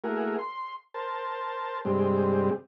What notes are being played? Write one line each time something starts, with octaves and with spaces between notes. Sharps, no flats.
A3 A#3 E4 F#4 G#4 A#4
C6
A#4 C5 A5
G2 C3 G3 G#3 C4